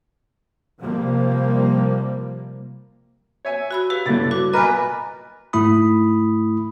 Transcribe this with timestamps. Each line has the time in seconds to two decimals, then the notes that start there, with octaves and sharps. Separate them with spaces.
0.80 C3 F3 G3 A#3
3.45 C#5 E5 G#5
3.71 F#4 B5 E6
3.90 G4 B4 F5
4.06 C#2 G2 D3 E4 A6
4.31 F#4 D6
4.54 B1 A#2 A#4 B4 D#5 G#5 D6
5.53 G#2 A3 E4 B5 D#6